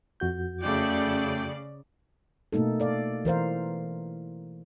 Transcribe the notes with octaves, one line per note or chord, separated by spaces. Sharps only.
F2 F#4 G6
C#3 A3 D5 G5
B2 A3 A#3 D#4 A4
A4 D5 F5
E3 A#4 C5 F5